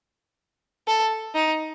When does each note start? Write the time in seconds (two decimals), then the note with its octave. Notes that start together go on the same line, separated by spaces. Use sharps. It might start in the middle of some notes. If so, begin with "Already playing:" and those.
0.88 A4
1.35 D#4